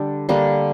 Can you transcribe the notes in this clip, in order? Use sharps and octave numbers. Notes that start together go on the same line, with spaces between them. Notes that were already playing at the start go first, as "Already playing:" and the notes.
Already playing: D3 G3 D4 A4
D3 G3 A#3 D4